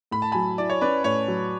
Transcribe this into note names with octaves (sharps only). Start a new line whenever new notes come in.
A2 B5
A5
F#3 G#5 B5
E4 D5
C#5
C#4 B4 D5
A2 C#5
F#3